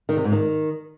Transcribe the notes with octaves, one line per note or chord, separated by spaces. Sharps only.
D#3
C3
G#2
D#3